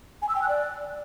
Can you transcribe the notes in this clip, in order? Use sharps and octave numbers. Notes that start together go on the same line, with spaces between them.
G#5
E6
G5
F#6
D5